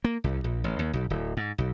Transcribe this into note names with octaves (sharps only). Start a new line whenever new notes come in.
A#3
C2
A#1
A1
D#2
B1
D1
G#2
B1